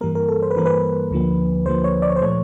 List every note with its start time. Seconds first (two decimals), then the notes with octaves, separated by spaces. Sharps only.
0.01 G2 E3 G3 A#3 A#4
0.15 A#4
0.28 A4
0.42 C5
0.51 B4
0.56 G2 E3 G3 A#3 A#4
0.66 B4
1.11 D2 D3 F3 A#3
1.66 D2 D3 F3 A#3 C5
1.84 C#5
2.02 D5
2.09 C#5
2.16 C5
2.21 A#2 F3 A3 C#5